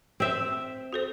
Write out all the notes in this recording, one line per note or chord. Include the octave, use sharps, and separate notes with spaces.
C4 E5
F#4 A4 C5